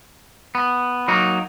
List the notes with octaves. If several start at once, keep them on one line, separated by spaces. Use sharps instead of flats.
B3
F#3 A#3 D#4 F#4